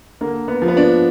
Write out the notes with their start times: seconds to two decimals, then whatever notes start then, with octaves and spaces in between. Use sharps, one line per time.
0.21 D3 A#3
0.48 B3
0.62 F3
0.68 B3
0.77 D4